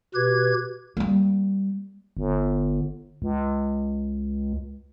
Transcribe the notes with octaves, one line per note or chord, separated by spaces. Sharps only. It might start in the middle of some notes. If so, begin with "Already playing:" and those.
B2 G4 B4 G#6
G3 A#3
G1
C#2